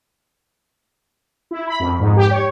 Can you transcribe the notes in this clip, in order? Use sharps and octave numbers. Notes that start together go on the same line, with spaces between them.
E4
B5
F2
G#2
G4
C#5